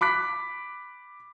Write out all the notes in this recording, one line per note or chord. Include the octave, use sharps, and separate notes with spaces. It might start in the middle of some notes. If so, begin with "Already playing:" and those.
B5 D6 F#6 B6